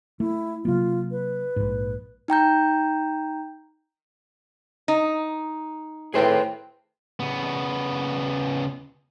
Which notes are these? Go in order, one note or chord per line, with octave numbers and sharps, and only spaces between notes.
A3 E4
C3 F#3 A#3 F4
B4
A#1 G#2
D#4 G5 A#5 G6
D#4
A2 G#4 B4 C5 G5
C#3 B3